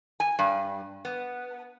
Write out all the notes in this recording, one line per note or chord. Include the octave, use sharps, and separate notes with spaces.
G#5
G2
B3